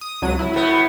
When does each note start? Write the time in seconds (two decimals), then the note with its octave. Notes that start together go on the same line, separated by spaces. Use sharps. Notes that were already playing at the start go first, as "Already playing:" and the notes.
0.01 D#6
0.22 C#2 F#3 D#7
0.39 E4
0.54 A2 B3